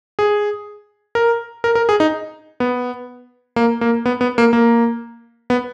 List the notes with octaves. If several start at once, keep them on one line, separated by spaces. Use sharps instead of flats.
G#4
A#4
A#4
A#4
G#4
D#4
B3
A#3
A#3
B3
B3
A#3
A#3
B3